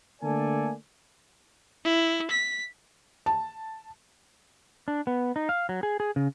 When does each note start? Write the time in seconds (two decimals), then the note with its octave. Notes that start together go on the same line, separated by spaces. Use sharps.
0.22 D3 A3 A#3 A4 D5 G#5
1.85 E4
2.31 B6
3.26 A5
4.88 D4
5.07 B3
5.36 D#4
5.49 F5
5.69 F#3
5.83 G#4
6.00 G#4
6.16 C#3